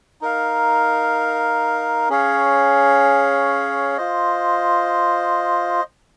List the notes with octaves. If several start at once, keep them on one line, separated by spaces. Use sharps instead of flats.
D#4 A#4 F5
C#4 G#4 C#5 F5
F4 C5 D#5